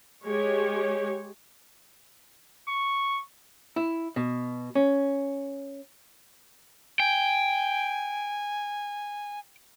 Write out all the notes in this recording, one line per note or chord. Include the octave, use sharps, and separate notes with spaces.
G#3 G4 C#5
C#6
E4
B2
C#4
G5 G#5